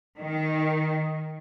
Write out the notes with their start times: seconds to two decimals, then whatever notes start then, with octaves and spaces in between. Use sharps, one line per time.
0.19 D#3